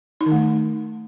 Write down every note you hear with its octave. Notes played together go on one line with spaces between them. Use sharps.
D#4
D#3
A3